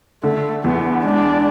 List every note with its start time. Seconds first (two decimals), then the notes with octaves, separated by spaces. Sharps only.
0.23 D3 A3
0.63 E2 B3
1.04 G#3 D4